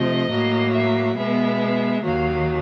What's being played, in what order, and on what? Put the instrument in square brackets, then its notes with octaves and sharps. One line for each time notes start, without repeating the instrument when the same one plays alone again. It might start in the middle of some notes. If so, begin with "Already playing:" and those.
Already playing: [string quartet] C3 F3 A3 D#5
A2 F#3 A#3
E5
B2 G#3 B3 E5
D#2 D#3 F#3 A#3 F5